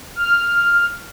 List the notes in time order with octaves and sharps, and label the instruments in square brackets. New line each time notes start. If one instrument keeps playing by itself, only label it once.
[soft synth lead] F6